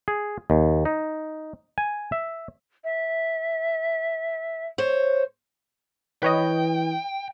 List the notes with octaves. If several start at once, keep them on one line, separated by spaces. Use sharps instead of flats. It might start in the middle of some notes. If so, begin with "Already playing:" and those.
G#4
D#2
D#4
G#5
E5
E5
C5 C#5
E3 B4 C#5 D#5 G5